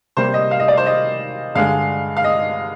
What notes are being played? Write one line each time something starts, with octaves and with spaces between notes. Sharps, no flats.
C3 G3 A#3 C5
D#5
F5
D#5
D5
C5
D#5
G2 D3 G#3 F5
F5
D#5